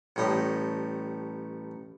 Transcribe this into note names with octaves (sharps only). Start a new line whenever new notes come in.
A1 A2 G3 D#5